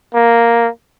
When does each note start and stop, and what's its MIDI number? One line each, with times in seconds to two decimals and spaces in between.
0.15 0.69 58